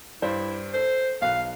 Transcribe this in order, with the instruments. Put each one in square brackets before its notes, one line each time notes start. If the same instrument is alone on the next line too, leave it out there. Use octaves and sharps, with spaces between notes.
[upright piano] G2 D4 C5 [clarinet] E4
[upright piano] A4 [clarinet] C5
[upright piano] B1 F#6 [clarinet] F5